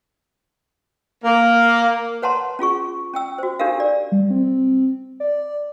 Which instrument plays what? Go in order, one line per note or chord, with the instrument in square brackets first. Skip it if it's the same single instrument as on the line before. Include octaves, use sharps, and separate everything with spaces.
[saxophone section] A#3
[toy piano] B4 C#5 F#5 A5 A#5 C6
C#4 F4 G#4 C#6
C#4 G5 E6
F#4 C5
D4 D#4 G4 A4 A#4 F5
D5
[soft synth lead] G3
C4
D5